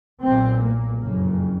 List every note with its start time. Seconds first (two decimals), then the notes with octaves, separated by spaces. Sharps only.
0.22 B1 A#2 C4
0.61 A#3
1.00 F#1 F2 C#3 A#3